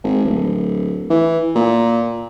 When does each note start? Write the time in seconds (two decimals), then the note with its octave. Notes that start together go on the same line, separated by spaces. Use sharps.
0.04 G#1
0.25 D1
1.10 E3
1.55 A#2